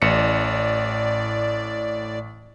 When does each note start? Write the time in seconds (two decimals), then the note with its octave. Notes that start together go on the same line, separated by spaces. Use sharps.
0.02 A1 A2 D5 C#7